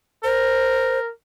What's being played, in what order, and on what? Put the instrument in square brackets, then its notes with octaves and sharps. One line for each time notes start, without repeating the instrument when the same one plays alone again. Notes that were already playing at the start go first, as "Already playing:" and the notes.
[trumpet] A#4 [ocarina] C5